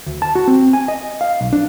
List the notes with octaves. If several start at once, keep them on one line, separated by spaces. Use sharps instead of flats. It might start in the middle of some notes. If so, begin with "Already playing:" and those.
D2
A5
F#4
C4
G#5
D#5
F5
B1
D4